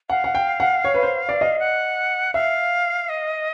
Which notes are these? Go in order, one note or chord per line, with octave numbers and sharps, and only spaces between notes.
F5 F#5
F#5
G5
F#5
C#5
B4
C5
D5
D#5
F#5
E5 F5
D#5